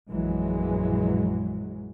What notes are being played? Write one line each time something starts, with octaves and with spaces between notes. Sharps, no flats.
A#1 F#2 E3 F#3 G#3